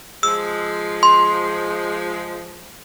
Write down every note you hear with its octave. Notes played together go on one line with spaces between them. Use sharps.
F3 G#3 E6
C6